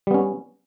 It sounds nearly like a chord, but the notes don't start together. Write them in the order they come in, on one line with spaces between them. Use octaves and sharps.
G3 B3 C#4